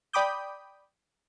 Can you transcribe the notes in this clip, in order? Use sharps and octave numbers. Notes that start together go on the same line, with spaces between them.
D5 G5 B5 D6 D#6 G6